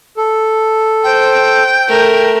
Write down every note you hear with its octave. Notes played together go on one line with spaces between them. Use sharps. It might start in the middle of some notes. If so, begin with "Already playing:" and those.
A4
C5 G5
A3 A#4